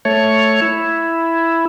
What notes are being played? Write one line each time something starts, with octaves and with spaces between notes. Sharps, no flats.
A3 C#5
E4